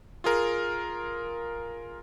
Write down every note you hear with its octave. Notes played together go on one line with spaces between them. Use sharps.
F4 G#4 A#4